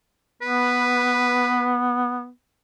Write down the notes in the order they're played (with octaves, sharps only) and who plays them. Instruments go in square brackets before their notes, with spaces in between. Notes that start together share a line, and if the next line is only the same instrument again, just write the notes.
[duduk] B3 [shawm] B4